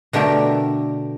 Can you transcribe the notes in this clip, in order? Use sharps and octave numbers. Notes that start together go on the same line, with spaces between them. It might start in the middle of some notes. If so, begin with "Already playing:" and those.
B2 D3 A3 G4 A#4